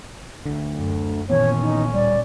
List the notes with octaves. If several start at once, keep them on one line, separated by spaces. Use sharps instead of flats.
D2 D3
F#2
A#2 D#3 E3 B3 C#4 C#5
D#4
D1 G3 D5